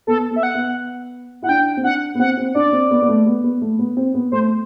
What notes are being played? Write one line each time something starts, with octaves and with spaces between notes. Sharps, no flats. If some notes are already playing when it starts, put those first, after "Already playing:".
B3 A4
B3
E5
F#5
B3
E4 F#5
D4 G5
C4
D4 F#5
B3
C4 F#5
C4
D4 D5
C4
B3
B3
A3
B3
B3
A3
B3
C4
B3
A3 C5